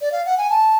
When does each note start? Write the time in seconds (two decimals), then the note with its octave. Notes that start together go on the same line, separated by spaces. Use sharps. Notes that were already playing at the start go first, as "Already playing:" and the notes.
0.01 D5
0.12 F5
0.26 F#5
0.38 G#5
0.50 A5